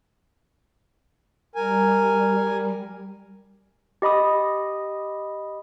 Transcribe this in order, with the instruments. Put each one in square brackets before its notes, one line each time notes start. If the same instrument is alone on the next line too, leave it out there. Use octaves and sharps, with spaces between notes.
[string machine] G3 [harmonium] A#4 G#5
[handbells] G4 D#5 B5 D#6